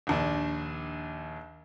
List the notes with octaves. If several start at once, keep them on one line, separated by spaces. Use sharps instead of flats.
A#1 D#2 D4